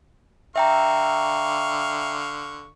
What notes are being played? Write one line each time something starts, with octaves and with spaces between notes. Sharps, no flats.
D3 E5 F5 G5 A#5 C#6